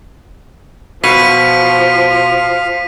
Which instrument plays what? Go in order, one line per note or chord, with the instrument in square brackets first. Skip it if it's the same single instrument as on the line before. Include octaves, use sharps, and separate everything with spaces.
[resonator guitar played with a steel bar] B2 [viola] F3 [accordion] F5 [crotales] B6 D#7